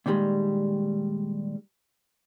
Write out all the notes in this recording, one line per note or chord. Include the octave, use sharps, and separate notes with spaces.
A#2 D#3 E3 G3 G#3